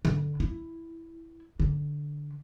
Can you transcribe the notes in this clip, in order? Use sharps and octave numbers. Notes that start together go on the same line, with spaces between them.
D3
E4
D3